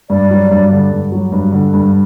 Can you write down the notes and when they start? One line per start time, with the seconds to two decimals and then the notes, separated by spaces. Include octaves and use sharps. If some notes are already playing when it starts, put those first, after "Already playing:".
0.10 G2 D5
0.31 F#3
0.51 G2
0.72 D3
0.92 G2
1.12 F#3
1.32 G2
1.53 D3
1.74 G2